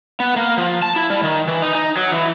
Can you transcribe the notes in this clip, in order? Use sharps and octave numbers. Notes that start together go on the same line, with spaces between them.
B3
A#3
F3
A5
E4
G3
D#3
E3
D#4
D#4
F#3
E3